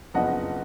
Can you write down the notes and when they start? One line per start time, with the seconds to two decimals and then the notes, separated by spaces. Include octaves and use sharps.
0.14 F#1 F2 F3 B3 D4 D#5 F#5